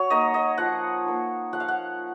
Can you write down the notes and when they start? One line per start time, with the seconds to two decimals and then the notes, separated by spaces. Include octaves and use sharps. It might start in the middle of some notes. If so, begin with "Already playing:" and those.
Already playing: F#3 C#5
0.10 A#3 D#4 D#5
0.34 D#5
0.58 F3 F#5
1.06 A#3 D#4
1.52 F3 F#5
1.60 F5
1.68 F#5